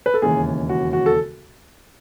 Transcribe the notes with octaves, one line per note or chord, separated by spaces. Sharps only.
B4
A4
E1 D#2 C#3 E3 G#4
F#4
F#4
A4